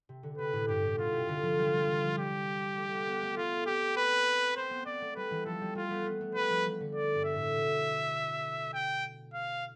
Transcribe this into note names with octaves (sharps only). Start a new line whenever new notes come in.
C3
D3
C3 B4
A2
G2 G4
A2
B2 F4
C3
D3
F3
G3
F3
G3
E3
F3
G3 G4
A3
B3
B3
A3
A3 F4
C4 G4
B4
C4 C5
B3
B3 D5
A3
G3 B4
E3
F3 A4
G3
A3 F4
B3
B3
A3
G3 B4
F3
E3
D3
D5
G2
E5
A2
B2
G5
F5